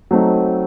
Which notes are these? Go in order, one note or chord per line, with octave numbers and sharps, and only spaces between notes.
F#3 A3 C4 D#4